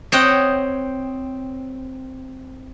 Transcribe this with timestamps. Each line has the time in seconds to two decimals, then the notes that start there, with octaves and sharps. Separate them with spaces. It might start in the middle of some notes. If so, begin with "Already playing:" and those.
0.12 C4 C#5 D#5 F#5 G5